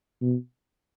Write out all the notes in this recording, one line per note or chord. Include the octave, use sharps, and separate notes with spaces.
B2